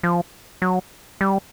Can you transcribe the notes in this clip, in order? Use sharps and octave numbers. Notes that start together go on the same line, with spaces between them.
F3
F#3
G3